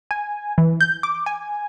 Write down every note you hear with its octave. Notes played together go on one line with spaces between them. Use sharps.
G#5
E3
G6
D6
G#5